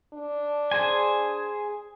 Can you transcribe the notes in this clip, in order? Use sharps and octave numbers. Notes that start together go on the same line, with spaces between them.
D4
G#4 C5 G#5